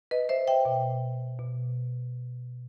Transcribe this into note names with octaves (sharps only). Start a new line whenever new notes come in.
B4 D#5
C5 E5
E5 G5
B2
B2